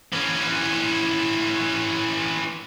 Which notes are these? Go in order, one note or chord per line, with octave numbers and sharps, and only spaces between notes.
E3 C#4